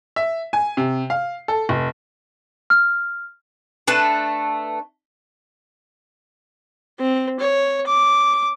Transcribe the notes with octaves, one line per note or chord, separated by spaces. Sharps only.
E5
G#5
C3
F5
A4
F1
F6
A3 D4 B4 A5
C4
C#5
D6